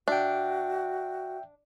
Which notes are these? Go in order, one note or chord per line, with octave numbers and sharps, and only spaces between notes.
D4 F#4 E5 G5